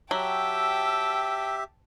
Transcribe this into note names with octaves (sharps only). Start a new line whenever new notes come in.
F#3 G4 E5 G5 A5 E6